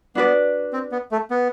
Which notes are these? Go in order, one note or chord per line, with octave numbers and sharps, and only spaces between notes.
B3 D4 F#4 B4 D5
C4
B3
A3
B3